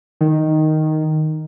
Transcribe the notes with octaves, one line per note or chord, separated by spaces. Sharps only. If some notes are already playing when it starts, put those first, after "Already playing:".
D#3